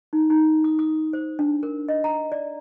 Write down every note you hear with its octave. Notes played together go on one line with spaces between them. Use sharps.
D#4
D#4
D#6
D#6
C5
D4
A#4
D#5
A#5
D5